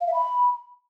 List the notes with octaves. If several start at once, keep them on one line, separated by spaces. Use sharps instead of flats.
F5
E5
B5